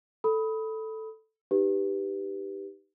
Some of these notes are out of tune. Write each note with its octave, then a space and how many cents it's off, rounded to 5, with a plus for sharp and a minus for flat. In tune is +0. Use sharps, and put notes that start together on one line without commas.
A4 +0 B5 +0 D#6 +25
D#4 +0 G4 +0 B4 +0